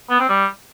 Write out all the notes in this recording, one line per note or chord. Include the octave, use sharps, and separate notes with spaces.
B3
C4
G3